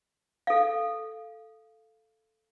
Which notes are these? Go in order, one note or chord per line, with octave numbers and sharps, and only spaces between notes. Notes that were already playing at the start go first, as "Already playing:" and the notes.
A4 F5